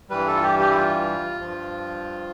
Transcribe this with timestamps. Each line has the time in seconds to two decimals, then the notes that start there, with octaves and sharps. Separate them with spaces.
0.10 G2 E3 G3 B4
0.27 A4
0.34 F4
0.42 G4
0.59 G4
0.70 E4
0.76 F4
1.41 G2 F3